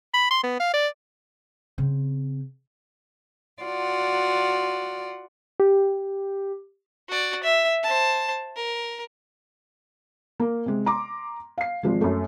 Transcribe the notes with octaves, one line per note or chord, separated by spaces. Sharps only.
B5
C6
B3
F5
D5
C#3 C4
F4 F#4 D5 F#5
G4
F#4 D5
E5
C5 A5
A#4
A#3
C3 G#3
A#5 C6 D6
F5 C7
G#1 F3 G#3
F#2 A3